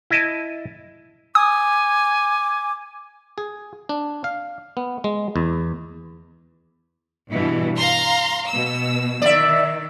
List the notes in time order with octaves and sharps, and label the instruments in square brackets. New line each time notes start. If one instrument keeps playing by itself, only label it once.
[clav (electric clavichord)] E4 D#5 A5
[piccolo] G#5 [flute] D6 [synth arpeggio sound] D#6
[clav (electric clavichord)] G#4
D4
F5
B3
G#3
E2
[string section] G2 B2 E3
F5 A#5 C6
B2 E6
[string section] D#3 [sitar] D5 E5